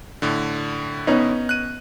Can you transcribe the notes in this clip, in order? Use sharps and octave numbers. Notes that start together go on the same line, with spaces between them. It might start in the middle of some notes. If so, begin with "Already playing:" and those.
A2 D3
B3 C#4 D#4
F#6 D#7